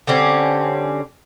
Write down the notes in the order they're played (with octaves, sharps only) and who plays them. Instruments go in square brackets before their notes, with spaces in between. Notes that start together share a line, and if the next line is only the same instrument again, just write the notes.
[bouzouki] D3 G3 C4 C#4